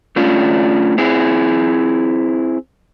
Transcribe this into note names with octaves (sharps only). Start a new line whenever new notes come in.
A3 C#4 D4 F4
C4 E4 G#4